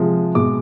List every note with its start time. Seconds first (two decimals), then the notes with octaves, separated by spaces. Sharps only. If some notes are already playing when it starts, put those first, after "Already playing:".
Already playing: C3 F3 G#3
0.35 B2 G#3 D6